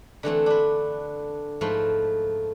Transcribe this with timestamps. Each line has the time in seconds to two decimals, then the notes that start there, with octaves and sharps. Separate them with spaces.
0.23 D3 E3 A3 C4
0.46 D4 B4
1.61 G#2 F3 A3 B4 C6